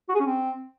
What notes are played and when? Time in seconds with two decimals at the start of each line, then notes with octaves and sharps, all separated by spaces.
0.09 F#4
0.14 G#4
0.20 C#4
0.25 C4